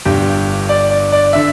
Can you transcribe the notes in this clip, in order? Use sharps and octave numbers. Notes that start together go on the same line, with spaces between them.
G1 G2 D3 G4
D5
D5
D5
D3 E5